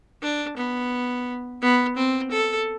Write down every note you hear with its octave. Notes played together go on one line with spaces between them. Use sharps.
D4
B3
B3
C4
A4